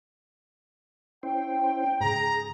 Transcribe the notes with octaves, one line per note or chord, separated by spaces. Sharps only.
C#4 E4 C5 G5
G#2 C#3 G#4 A#5